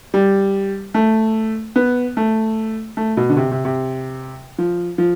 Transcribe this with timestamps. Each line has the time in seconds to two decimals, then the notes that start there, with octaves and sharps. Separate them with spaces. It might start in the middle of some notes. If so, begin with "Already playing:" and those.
0.14 G3
0.94 A3
1.76 B3
2.17 A3
2.97 A3
3.17 B2
3.29 D3
3.37 C3
3.51 C3
3.65 C3
4.58 F3
4.98 F3